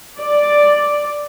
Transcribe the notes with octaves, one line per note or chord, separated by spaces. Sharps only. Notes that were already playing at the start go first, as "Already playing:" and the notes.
D5